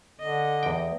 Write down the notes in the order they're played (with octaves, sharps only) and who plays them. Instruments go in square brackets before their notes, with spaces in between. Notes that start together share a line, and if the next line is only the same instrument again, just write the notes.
[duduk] D3 [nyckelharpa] D#5
[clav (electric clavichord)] E2 G5